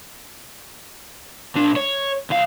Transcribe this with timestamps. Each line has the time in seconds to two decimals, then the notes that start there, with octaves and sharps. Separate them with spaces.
1.55 A#2 D4
1.76 C#5
2.30 C2 F5